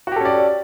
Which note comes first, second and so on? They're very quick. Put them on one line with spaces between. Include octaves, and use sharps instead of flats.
F#4 G4 A4 C#4 D5